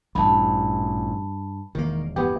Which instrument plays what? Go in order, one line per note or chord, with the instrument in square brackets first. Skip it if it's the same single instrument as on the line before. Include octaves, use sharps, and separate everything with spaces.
[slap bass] A1 A#2 E3 [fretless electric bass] G2 [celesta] A5 B5
[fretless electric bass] E1 [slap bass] D#3 A#3
[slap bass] G2 E3 [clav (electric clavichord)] B3 G4